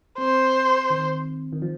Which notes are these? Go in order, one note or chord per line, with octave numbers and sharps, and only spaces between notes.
C4 C5
D#3
D#3
F3